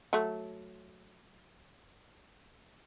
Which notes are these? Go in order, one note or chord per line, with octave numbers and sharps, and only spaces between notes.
F#3 A3